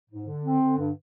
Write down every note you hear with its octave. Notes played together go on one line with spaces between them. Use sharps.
G#2
D3
C4
D3
G2